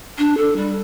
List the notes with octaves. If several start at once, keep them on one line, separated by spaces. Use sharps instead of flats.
D4
A4
G3